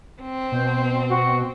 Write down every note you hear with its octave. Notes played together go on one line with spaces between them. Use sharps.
C4
B2 C5
F#4